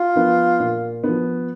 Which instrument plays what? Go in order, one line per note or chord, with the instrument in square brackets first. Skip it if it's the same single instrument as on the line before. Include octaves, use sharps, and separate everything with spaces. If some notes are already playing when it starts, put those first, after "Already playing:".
Already playing: [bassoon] F4
[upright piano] F3 B3
A#2
F3 B3